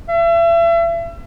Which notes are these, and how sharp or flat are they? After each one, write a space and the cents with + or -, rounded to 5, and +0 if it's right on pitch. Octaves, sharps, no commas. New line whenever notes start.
E5 +35